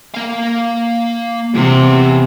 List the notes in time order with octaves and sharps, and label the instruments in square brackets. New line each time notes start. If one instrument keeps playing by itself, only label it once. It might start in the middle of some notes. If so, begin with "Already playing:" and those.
[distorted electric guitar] A#3 F5
[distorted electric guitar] E2 [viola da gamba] C3